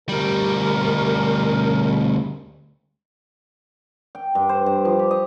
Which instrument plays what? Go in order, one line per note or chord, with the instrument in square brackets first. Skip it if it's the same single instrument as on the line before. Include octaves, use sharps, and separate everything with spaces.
[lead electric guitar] D2 G3 [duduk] A#4
[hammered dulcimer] G5
G2
C5
G2
F3
G4
D#5